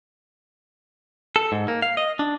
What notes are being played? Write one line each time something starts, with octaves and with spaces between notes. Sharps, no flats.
A4
G#2
A#3
F5
D#5
D4